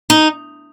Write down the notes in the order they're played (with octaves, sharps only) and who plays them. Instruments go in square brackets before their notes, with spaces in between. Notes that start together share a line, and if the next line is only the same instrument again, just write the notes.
[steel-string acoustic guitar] D#4